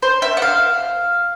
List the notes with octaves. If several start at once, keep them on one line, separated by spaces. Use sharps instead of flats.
C5
E5
F#5
F5